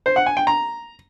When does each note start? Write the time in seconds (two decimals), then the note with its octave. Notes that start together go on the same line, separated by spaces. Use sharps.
0.06 C5
0.16 F#5
0.26 G#5
0.37 G5
0.47 A#5